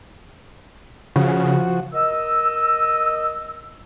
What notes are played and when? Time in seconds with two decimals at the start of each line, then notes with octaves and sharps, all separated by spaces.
1.16 C#3 F3 F#4
1.93 A#4 D#5 E6